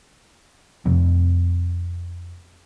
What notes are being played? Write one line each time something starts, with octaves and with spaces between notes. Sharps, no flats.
F2 C3